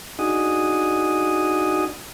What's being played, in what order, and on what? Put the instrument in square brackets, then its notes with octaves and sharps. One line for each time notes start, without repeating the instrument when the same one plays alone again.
[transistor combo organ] D4 D#4 F#4 G#4 D#6